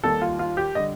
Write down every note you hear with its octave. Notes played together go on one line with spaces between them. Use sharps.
D#2 D#3 G3 A4
F4
F4
G4
D3 G3 D#5